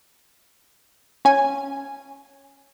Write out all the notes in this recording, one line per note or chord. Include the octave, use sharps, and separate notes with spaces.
C#4 G#5